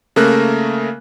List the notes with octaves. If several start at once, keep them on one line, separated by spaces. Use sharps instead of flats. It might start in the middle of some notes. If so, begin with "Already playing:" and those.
C#3 A3 A#3 A#4 F#6